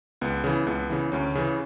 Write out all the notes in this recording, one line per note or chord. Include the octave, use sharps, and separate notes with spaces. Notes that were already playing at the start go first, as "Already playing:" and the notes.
C#2 B3
C#3 E3
C#2 B3
C#3 E3
D2 C#4
C#3 E3